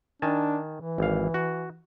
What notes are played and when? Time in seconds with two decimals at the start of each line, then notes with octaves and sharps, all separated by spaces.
0.22 D#3 D4 G#5 A5
0.76 E3
0.98 G#1 F5
1.34 F#4